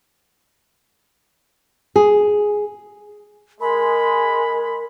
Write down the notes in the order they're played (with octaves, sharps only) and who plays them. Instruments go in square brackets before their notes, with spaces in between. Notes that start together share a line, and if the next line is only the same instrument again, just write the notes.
[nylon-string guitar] G#4
[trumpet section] G#3 [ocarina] A#4 [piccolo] B5